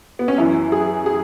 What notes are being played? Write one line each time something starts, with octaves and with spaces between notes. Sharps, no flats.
B3
C#4
F#2 E3 E4
G#4
G#4